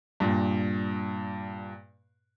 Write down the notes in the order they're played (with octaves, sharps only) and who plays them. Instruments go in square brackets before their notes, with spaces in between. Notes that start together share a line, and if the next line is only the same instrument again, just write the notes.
[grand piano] G2 A#2